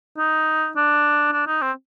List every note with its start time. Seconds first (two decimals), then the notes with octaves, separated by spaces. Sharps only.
0.18 D#4
0.76 D4
1.32 D4
1.47 D#4
1.62 C4